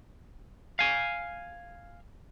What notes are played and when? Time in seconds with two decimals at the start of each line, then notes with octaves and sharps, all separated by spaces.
0.79 F5 G#5